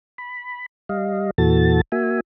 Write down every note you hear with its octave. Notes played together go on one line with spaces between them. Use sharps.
B5
G3 D#5 F5
E2 A#2 E3 F#4 A4 A6
A#3 F#4 E5 G#5